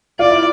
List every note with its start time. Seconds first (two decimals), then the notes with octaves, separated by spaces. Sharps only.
0.19 F4 D5
0.31 E4